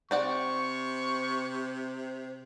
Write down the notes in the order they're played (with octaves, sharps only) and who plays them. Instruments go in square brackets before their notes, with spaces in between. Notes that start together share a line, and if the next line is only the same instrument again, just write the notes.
[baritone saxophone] C3 [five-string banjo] C4 D5 F#5 [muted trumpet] C#6